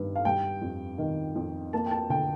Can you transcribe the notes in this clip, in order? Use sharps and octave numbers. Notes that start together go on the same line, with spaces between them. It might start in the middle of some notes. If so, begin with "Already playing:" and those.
Already playing: G2 D#3
F5
G3 G5
F2
D#3
F2
A#3 A5
G5
A5
D3 G5